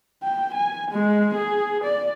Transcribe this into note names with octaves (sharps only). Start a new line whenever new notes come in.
G5
G#5
G#3
G#4
D5